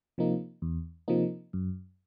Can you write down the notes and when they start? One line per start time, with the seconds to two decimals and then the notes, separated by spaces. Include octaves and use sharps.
0.18 C3 F3 A#3 D#4
0.62 E2
1.08 C3 F3 A#3 D#4
1.53 F#2